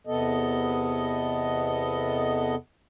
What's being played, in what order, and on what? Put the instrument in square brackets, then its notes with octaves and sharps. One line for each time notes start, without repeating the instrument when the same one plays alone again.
[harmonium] E2 C3 B3 A4 D#5